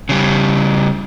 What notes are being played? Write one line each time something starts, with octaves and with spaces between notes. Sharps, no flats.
C#3 G3